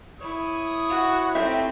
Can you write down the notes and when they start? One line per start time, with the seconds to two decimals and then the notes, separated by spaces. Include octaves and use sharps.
0.19 E4 C#5 D#6
0.89 F#4
1.35 A3 C4 D#4 G4 E5